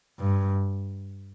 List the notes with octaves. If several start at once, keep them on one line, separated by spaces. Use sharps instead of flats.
G2